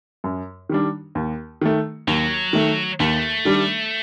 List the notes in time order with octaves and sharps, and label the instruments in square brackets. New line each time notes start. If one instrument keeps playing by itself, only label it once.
[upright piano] F#2
D#3 G3 D4
D#2
D#3 A3
[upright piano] D#2 [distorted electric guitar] F#3
[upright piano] D#3 A3
[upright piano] D#2 [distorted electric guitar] A3
[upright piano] D#3 G3 D4